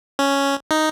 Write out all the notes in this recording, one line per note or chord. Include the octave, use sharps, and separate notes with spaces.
C#4
D#4